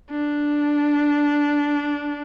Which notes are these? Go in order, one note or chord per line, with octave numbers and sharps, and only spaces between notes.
D4